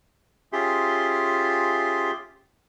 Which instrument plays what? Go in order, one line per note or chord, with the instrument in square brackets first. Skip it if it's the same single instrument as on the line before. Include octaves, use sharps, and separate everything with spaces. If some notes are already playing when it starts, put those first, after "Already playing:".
[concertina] C#4 F4 G4 G#4 E5 C6